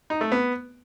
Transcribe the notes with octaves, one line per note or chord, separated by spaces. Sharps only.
D#4
A3
B3